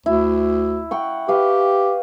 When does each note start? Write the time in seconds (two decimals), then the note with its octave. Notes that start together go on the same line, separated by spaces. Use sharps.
0.06 D2 E4
0.91 F#5 G5 C#6
1.28 G4 B4 F5